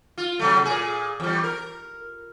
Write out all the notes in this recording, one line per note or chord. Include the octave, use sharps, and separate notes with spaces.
F4
C3 F#3 A3
A#2 G#4
E2 G3
A#4